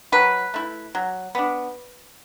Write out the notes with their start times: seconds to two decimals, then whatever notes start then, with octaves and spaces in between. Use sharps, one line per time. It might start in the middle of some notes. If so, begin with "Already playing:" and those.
0.12 F#3 B4
0.54 A3 E4
0.95 F#3
1.35 B3 D4